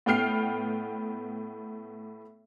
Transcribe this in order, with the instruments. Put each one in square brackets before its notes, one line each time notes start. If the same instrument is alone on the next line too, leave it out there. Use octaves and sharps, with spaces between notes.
[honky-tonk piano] A2 B3 G5 F6 C7